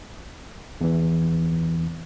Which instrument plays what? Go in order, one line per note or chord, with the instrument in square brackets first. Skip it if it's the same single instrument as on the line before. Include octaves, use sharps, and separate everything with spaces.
[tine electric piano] E2 E3